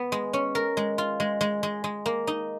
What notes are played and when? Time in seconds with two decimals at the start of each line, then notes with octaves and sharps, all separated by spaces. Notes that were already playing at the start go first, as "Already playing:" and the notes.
Already playing: B3
0.12 G#3
0.33 C#4
0.55 A#4
0.77 G#3
0.98 F4
1.20 G#3
1.41 G#3
1.63 G#3
1.84 G#3
2.06 A#3
2.27 D#4